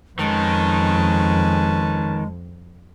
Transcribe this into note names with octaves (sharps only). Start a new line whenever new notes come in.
F2 D#3 G#3 C#4 B4 A5